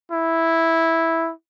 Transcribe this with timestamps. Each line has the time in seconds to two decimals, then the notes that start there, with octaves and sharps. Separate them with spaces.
0.12 E4